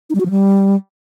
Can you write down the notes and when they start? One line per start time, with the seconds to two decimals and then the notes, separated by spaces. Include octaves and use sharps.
0.10 D#4
0.15 G3
0.20 F#4
0.25 F3
0.31 G3